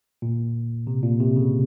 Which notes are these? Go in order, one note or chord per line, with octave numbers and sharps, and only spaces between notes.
A#2
C3
A#2
C3
C#3